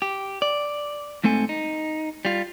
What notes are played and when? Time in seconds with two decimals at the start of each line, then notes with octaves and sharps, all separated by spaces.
0.02 G4
0.42 D5
1.24 G#2 A3 C4 A4 G#5
1.49 D#4
2.25 G3 F4